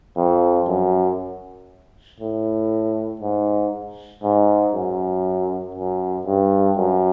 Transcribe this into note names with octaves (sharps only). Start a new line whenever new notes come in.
F2
F#2
A2
G#2
G#2
F#2
F#2
G2
F#2